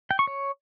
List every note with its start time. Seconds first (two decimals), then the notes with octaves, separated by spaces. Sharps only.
0.11 G5
0.19 C#6
0.27 C#5